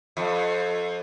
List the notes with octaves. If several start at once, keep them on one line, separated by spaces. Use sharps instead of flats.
F2